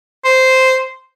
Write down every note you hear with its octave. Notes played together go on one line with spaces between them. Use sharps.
C5